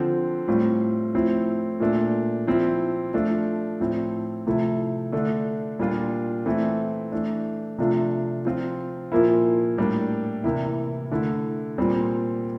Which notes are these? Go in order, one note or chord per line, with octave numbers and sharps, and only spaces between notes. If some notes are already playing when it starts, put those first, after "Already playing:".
Already playing: D3 F3 C4
A2 G3 C4 F4
A2 F3 C4 E4
A#2 A3 D4
F3 C4 E4
F3 A3 D4 F4
A2 F3 C4 E4
C3 F3 A3 E4
D3 A3 D4
A#2 G3 D4 F4
E3 A3 C4 E4
E3 A3 D4
C3 F3 A3 D4 F4
F3 C4 F4
A#2 F3 A#3 E4
A2 G3 A#3 D4
C3 E3 A#3 E4
D3 A3 E4
A#2 G3 C4